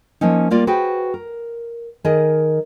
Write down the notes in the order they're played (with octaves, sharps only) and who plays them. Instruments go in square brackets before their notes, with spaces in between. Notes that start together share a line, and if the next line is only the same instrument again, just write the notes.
[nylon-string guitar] F3 A#3 C#4 D#4
G3 A#3 F4 D5
F#4 G#4 B4 C5 G5
A#4
D#3 G#4 A#4 D#5